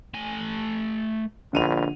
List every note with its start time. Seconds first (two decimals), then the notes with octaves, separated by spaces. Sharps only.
0.14 A3 G#5
1.53 A#1 D3 D#7 F7